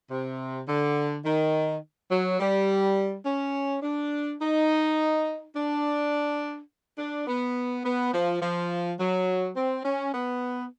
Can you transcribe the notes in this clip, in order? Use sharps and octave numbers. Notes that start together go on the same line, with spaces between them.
C3
D3
D#3
F#3
G3
C#4
D4
D#4
D4
D4
B3
B3
F3
F3
F#3
C4
C#4
B3